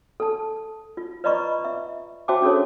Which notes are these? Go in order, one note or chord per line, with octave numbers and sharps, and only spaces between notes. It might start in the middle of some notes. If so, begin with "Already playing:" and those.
A4 A5
F4
B4 D5 D#5 A#5 B5 C#6
E5
F#4 C5 E5 G5 A5 D6
C#4 D4 G#4 A4 C#5